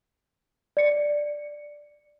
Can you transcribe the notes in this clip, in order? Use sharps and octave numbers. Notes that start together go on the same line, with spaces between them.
D5 C#7